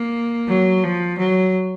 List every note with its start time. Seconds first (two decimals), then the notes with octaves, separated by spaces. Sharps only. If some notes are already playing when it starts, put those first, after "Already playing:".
Already playing: A#3
0.48 F#3
0.83 F3
1.18 F#3